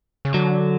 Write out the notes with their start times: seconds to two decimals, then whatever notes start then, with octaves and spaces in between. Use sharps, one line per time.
0.25 C#3
0.34 D3 F#3